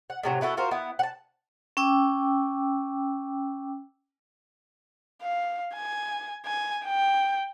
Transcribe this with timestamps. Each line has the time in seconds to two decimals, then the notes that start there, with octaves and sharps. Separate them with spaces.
0.10 F#5
0.23 A2 C3 F#3
0.41 B3 E4 F#4 A4
0.57 F4 F#4 A#4 C5
0.71 B3 E4
0.99 F#5 A5
1.77 C#4 G5 D6 E6
5.22 F5
5.74 G#5
6.45 G#5
6.86 G5